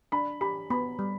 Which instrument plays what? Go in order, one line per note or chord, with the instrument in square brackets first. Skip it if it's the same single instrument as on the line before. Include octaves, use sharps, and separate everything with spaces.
[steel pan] D4 [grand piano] B5
[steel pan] G4 [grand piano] B5
[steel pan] B3 [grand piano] B5
[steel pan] G3